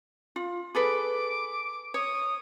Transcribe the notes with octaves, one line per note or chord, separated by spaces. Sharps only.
F4
G#4 A4 B4 D6
C#5 D#6